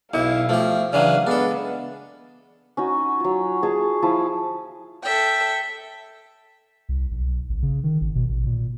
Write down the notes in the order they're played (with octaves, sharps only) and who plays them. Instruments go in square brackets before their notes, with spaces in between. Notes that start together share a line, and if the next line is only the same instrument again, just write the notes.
[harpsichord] B1 [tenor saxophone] E4 [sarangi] F5
[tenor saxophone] F3 [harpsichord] A3 G4
[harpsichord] C#3 E3 F#3 [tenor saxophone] D4 [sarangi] F5
[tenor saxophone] G#3 [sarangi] B3 [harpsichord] D4 A4
[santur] C#4 D#4 F#4
F#3 F4
G#4 C#5 A5
F3 E4 A5 D#6
[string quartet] A4 E5 G5
[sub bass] C2
B1
A1
C#3
D#3
G#1
B2
A1
A#2